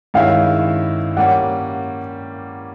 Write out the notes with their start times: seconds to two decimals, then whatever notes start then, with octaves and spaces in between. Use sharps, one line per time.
0.14 G2 D#3 G#3 C#4 E4 F5
1.17 G3 A#3 C#4 F#5